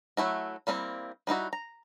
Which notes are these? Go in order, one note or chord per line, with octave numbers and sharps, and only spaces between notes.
F#3 A3 E4 F#4
G3 A#3 C4 D#4 E4
G3 D#4 E4 F#4
A#5